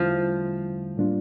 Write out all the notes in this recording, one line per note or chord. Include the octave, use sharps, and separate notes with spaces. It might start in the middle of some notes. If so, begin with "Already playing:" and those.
Already playing: E2 D3 F3 G3 A3 C#4 E4
A2 G3 A#3 D4 F4